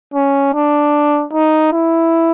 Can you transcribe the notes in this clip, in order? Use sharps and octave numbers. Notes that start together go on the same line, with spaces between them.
C#4
D4
D#4
E4